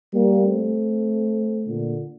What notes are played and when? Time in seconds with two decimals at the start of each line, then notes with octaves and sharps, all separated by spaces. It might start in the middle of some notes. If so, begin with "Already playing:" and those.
0.13 G3 A#3
0.43 A3 C4
1.65 A#2 D3